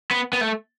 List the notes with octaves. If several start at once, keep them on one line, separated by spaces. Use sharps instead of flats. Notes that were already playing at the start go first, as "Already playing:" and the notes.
B3
B3
A3